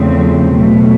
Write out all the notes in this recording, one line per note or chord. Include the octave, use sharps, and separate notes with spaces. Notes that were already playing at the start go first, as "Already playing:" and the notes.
Already playing: E2 C#3 F3 A3 C4
B2 F#3 A3